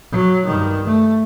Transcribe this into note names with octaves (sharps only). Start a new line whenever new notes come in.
F#3
G2 D#3
A3